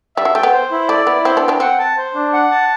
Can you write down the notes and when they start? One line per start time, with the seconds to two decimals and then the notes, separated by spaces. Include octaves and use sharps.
0.17 G3 E5
0.25 F#3
0.34 A3 G5
0.43 B3
0.53 C5
0.71 E4
0.88 A3 D5
1.06 B3 E4
1.25 C4 C5
1.37 B3 D4
1.42 G5
1.48 B3 D4
1.60 C4 F#5
1.79 A5
1.97 C5
2.14 D4
2.33 F#5
2.51 A5